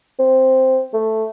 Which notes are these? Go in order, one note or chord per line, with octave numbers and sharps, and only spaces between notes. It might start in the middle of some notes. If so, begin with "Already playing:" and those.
C4
A3